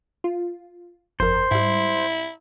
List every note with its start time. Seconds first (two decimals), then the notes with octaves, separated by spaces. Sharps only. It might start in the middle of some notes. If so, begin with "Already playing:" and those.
0.24 F4
1.20 G1 F2 A#4 C5
1.51 G#2 G3 E4